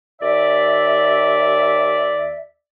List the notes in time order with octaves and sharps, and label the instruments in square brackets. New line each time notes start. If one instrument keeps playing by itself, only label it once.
[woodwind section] D#2 D5 E5